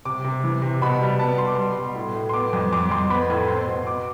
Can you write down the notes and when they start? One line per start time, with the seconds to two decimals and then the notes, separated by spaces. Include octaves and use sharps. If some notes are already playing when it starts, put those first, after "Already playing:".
0.05 C3 D6
0.24 C3
0.44 E3
0.62 C3
0.81 B2 B5
1.01 G3
1.19 B3 A5
1.38 B3 C6
1.47 D6
1.55 G3 C6
1.76 B2
1.95 A2
2.14 A2
2.29 C6
2.34 B3 D6
2.53 F2
2.73 F2 D6
2.91 F2 C6
3.10 B3 B5
3.30 A2
3.48 C4 C6
3.67 B2
3.86 B3 D6